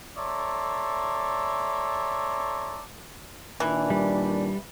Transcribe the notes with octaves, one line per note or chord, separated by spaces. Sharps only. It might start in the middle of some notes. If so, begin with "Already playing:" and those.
A4 C#5 D5 E5 A#5 C6
A#2 D#3 E3 D4
G3